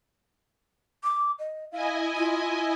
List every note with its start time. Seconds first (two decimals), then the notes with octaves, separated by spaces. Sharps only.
1.04 D6
1.39 D#5
1.72 E4 D#5 F5 G#5
2.16 F4